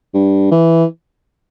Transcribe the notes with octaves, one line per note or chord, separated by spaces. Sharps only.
G2
E3